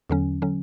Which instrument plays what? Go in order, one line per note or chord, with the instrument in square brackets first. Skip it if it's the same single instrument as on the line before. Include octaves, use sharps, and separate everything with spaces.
[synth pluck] E2 D3 F#3 C#4
D3 F#3 C#4